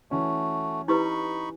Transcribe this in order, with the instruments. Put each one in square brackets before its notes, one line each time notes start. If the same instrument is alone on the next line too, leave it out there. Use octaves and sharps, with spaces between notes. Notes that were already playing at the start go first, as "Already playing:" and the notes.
[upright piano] E3 C#4 [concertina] A3 F#4
[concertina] D#4 B5 C#6 [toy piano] E4 G4 B4